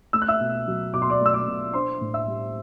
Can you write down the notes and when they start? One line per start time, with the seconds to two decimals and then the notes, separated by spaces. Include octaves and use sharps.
0.13 A3 E6
0.22 F#6
0.28 E5 E6
0.40 B2
0.68 F#3
0.94 B2 D6
1.02 C6
1.10 D5 D6
1.21 A3 E6
1.34 D5 D6
1.48 B2
1.73 D4 C5 C6
2.01 A2
2.14 E5 E6
2.27 G3